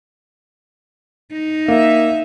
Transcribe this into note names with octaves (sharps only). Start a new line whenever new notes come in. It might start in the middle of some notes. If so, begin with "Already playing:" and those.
D#4
A#3 E5